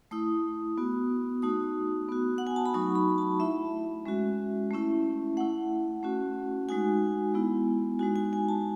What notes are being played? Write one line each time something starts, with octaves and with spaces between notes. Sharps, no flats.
A3 E4 D#6
B3 F#4
A3 D#4 F#4 D#6
B3 F#4
F#5
G#5
A5
B5
F#3 A3 D#4 F#4 C#6
B5
A5
A3 E4 E5
G#3 C#4 F#4
A3 C#4 E4
A3 E4 F#5
A3 C#4 F#4
G#3 D#4 F#4 G#5
G#3 B3 E4
G#3 D#4 F#4 G#5
G#5
G#5
A5